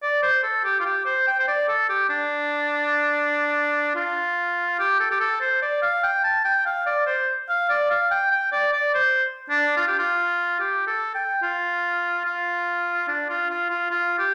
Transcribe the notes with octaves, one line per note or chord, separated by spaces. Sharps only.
D5
C5
A4
G4
F4
G4
C5
G5
C5
D5
A4
G4
D4
F4
G4
A4
G4
A4
C5
D5
F5
G5
A5
G5
F5
D5
C5
F5
D5
F5
G5
G5
D5
D5
C5
D4
F4
G4
F4
G4
A4
G5
F4
F4
D4
F4
F4
F4
F4
G4